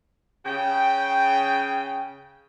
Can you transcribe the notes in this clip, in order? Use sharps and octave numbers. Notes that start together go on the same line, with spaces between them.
C#3 G5